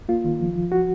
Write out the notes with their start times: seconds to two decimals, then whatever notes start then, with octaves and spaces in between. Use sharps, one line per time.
0.09 A#3 F4
0.24 D#3
0.40 F3
0.56 F3
0.72 F#4